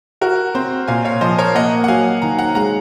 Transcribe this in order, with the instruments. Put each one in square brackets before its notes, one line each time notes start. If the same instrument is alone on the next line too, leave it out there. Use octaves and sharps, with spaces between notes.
[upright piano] F#4 [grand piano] A#4
[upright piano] C4 [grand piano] C5
[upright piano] A#2 [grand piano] F5 G#5
[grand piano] C#5 F5
[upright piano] F3 [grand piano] C5 D#5
[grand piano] A#4 C#5
[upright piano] A#3 [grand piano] D#5 F#5
[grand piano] F#5
[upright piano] F#3 [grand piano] F5 G#5
[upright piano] D#3 [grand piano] A#5
[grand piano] F#5 A#5
[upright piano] G#3 [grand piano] F#5 A#5